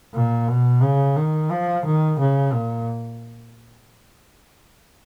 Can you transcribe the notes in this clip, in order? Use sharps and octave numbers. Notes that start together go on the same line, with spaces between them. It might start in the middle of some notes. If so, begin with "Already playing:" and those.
A#2
B2
C#3
D#3
F3
D#3
C#3
A#2